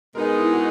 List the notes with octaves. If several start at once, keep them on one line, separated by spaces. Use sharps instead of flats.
B2 G#3 B3 D#4 G#4 A#4
E4
F#4